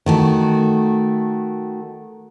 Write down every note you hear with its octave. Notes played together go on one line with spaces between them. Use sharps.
D#3 A3 F#4